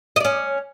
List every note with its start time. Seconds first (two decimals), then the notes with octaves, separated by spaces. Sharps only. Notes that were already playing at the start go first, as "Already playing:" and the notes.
0.16 D#5
0.20 D5
0.25 C#4